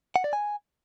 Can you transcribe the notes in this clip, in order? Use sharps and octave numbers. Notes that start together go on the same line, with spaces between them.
F#5
D5
G#5